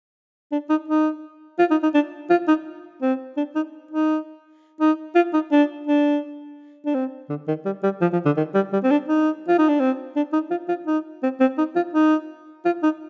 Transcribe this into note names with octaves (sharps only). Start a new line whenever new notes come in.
D4
D#4
D#4
F4
D#4
D#4
D4
F4
D#4
C4
D4
D#4
D#4
D#4
F4
D#4
D4
D4
D4
C4
D3
D#3
G3
G3
F3
F3
D3
D#3
G3
G3
C4
D4
D#4
F4
D#4
D4
C4
D4
D#4
F4
F4
D#4
C4
C4
D#4
F4
D#4
F4
D#4